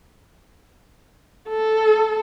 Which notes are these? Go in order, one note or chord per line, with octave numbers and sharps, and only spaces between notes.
A4